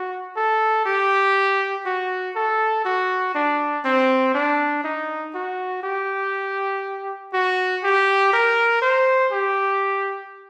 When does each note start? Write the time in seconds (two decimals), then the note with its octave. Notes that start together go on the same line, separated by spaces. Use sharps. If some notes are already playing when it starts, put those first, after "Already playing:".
Already playing: F#4
0.36 A4
0.86 G4
1.86 F#4
2.36 A4
2.85 F#4
3.35 D4
3.85 C4
4.34 D4
4.84 D#4
5.34 F#4
5.83 G4
7.33 F#4
7.83 G4
8.33 A#4
8.82 C5
9.32 G4